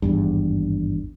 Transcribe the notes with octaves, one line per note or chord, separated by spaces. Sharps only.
G#1 E2 G2